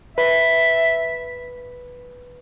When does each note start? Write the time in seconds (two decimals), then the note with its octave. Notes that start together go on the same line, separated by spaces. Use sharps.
0.17 B4 E5